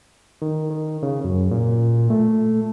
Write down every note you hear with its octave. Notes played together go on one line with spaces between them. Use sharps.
D#3
D#3
C#3
F#2
A#2
A3